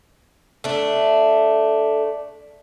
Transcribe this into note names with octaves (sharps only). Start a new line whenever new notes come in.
A3 D4